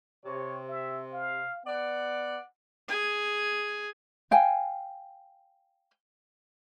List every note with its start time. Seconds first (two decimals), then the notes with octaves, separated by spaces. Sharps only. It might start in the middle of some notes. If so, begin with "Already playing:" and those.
0.25 C3 C#5
0.68 E5
1.13 F5
1.65 B3 D5 F#5
2.88 G#4 G#5
4.31 F5 G5 G#5